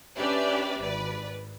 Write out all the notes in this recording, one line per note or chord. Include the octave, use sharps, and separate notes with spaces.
C#4 D4 G4 B4 D5 E5
G#1 B4 D5